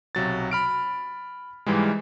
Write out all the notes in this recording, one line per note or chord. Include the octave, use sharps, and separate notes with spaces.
B1 C3 F#3 A6
B5 F6 D7
G#2 E3 G3 G#3